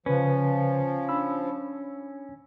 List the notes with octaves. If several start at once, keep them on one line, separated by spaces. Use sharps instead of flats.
C#3 F3 C#4 B4
D4 B5 E6